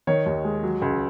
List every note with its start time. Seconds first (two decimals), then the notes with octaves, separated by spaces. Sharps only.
0.07 D#3 C#5
0.26 D#2
0.44 G#3
0.63 F#3
0.82 C#2